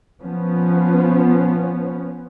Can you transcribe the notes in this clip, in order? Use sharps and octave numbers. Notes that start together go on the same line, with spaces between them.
F3 B3 C#4